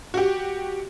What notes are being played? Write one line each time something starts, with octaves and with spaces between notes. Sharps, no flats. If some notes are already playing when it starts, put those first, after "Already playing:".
F#4 G4